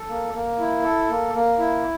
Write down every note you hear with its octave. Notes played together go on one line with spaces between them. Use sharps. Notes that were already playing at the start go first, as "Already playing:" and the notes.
Already playing: A4
A#3
A#3
E4
A4
A#3
A#3
E4